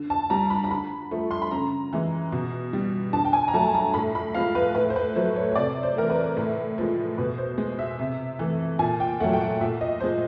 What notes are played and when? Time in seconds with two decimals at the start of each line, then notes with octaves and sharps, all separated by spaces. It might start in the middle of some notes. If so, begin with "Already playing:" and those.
Already playing: D3
0.10 A5
0.30 G3 A#5
0.50 B5
0.64 A#5
0.71 D3 B5
1.11 F3 A3
1.31 C6
1.42 B5
1.51 C#3 A#5
1.93 E3 G#3
2.32 B2
2.73 G3
3.13 D3 A5
3.25 G5
3.33 G#5
3.48 A#5
3.54 F#3 A3 A5
3.74 A#5
3.94 A2 B5
4.15 B5
4.35 F3 G#3 F5
4.55 B4
4.75 A2 B4
4.90 C5
4.96 B4
5.15 F#3 A3 C5
5.36 C#5
5.52 C#5
5.56 C3 D5
5.83 C5
5.96 E3 A3 A#4
6.10 B4
6.37 A2
6.78 F3 G#3
7.18 B2 B4
7.38 C5
7.58 G#3
7.79 E5
7.99 C3
8.39 E3 A3
8.79 A#2 G#5
9.00 G5
9.20 F#3 A3 F#5
9.33 G5
9.41 F#5
9.61 A#2 E5
9.81 D#5
10.00 F3 G#3 C5